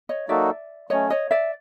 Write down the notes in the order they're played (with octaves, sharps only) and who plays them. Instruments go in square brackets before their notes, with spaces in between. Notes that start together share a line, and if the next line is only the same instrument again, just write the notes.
[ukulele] C#5 D#5
[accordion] F#3 A#3 D#4 F#4 A4 [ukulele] D5 E5
[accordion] F#3 A3 C#4 [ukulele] C#5 D#5
[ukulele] C#5 D#5
D5 E5